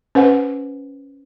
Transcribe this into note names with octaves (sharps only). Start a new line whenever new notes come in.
C#4 B4 C5 F#5